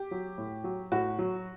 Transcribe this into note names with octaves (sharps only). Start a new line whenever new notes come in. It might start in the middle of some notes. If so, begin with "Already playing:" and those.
Already playing: G4
F#3
A2
F#3
A2 F#4
F#3